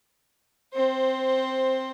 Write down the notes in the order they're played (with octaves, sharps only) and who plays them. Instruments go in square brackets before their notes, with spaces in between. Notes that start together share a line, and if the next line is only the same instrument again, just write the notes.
[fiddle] C4 C5